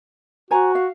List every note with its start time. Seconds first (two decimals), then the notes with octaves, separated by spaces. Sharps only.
0.51 F#4 C5 G#5 A#5
0.75 F5